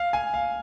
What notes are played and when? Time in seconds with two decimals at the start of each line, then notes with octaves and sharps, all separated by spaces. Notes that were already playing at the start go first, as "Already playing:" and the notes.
Already playing: F5
0.13 G#5
0.34 F5